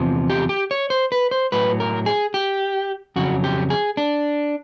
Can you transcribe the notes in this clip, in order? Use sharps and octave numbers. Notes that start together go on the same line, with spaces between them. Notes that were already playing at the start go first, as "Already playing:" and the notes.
Already playing: E2 C3 F3
G4
G4
C#5
C5
B4
C5
A2 F#3 B4
A#4
G#4
G4
F2 C#3 F#3 F#4
G4
G#4
D4